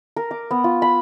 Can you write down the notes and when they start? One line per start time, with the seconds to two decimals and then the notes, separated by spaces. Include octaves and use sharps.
0.16 A#4
0.31 D6
0.51 B3
0.64 F4
0.82 B5